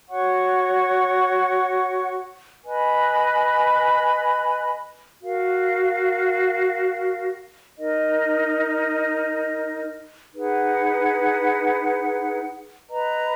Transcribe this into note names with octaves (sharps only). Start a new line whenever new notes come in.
F#4 C#5 F#5 C#6
B4 D#5 G#5 B5
F#4 A#4 F5
D#4 A#4 D#5
D#4 G#4 B4 F#5
B4 D#5 A#5